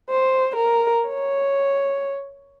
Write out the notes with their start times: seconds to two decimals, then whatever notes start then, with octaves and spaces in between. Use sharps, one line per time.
0.10 C5
0.56 A#4
1.08 C#5